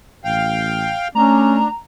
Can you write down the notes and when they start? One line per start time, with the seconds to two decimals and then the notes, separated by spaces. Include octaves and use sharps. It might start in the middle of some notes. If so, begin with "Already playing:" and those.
0.24 A1 F5 G5
1.15 A3 C#4 D4 A#5